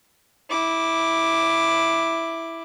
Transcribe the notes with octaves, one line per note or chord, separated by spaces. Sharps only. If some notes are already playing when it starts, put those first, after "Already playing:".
E4 D6